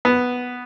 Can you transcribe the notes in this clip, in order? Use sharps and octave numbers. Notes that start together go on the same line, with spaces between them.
B3